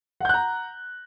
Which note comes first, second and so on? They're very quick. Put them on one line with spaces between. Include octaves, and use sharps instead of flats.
F#5 G6 F#6 A#5